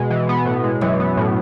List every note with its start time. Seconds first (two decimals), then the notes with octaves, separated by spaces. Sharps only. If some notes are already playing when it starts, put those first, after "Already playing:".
Already playing: B2 G#3
0.10 E3
0.29 B3
0.46 A2
0.64 G#3
0.81 F#2 E3
1.00 B3
1.17 A2